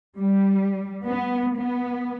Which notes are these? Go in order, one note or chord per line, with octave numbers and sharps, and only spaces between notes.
G3
B3
B3